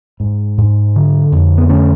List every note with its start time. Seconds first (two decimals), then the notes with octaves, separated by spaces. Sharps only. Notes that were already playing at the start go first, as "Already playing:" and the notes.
0.20 G#2
0.58 G#2
0.95 D3
1.32 F2
1.58 B3
1.69 D3 A3 C#4